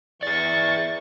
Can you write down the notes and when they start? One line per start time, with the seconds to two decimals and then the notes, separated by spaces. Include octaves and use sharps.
0.23 E3 G#4 D5 C#6 A6